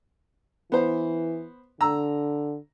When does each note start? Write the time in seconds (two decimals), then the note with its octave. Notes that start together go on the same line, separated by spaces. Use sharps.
0.72 E3 B3 C5
1.81 D3 A#5 E6